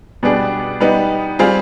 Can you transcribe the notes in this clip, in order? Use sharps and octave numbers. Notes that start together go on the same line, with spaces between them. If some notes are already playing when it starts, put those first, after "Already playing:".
B2 G3 B3 D4 G#4
G3 B3 D#4
G3 C4 F4 G#4